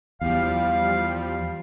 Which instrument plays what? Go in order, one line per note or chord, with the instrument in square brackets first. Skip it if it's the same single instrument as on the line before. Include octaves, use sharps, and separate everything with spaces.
[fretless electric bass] E2 [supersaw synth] F3 G3 [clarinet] F5